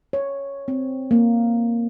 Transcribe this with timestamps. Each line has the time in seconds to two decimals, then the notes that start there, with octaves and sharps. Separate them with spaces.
0.13 C#5
0.68 C4
1.11 A#3